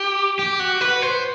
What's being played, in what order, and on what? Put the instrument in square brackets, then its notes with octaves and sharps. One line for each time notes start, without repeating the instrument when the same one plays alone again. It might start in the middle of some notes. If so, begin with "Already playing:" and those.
Already playing: [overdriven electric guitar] G4
G4
F#4
B4
C5